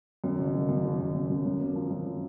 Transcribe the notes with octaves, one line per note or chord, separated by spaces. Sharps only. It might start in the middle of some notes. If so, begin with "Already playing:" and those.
F#2
F#1
F#1
F#2
F#1
F#1
F#2
F#2
F#2
A#3
F3
F#2
F3